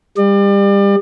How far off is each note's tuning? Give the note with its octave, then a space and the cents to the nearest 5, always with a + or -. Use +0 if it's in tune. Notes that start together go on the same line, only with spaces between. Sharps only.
G3 +30 D5 +35